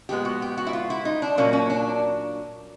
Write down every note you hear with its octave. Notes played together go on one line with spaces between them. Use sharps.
A#2 F3 G#3 B3 G4
F#4
G4
F#4
E4
F4
E4
D#4
D4
A#2 F#3 A#3 C#4
C#4
D4